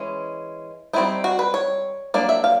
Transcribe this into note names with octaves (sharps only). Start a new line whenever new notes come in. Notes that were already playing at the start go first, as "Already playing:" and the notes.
Already playing: E3 G#3 C#4
G3 C4 D#4 E4
F#4
B4
C#5
F#3 A#3 D4 D5
E5
F5